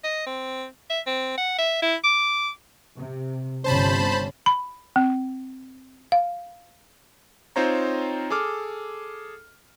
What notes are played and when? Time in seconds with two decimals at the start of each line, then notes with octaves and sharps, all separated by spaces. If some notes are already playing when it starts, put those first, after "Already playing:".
0.04 D#5
0.26 C4
0.90 E5
1.07 C4
1.37 F#5
1.58 E5
1.82 E4
2.04 D6
2.98 C3
3.64 G1 C3 C#4 C5 A5 B5
4.46 B5
4.96 C4
6.12 F5
7.56 C4 D#4 F4 C5 C#5 A#5
8.30 G#4 A4 D6 F6